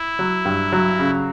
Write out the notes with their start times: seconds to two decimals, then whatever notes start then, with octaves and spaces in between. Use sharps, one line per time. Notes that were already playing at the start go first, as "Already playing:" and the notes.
Already playing: E4
0.19 F#3
0.45 G2
0.72 F#3
0.99 C#3